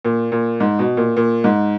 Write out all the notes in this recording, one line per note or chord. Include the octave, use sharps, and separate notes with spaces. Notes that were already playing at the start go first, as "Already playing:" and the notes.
A#2
A#2
G#2
B2
A#2
A#2
G#2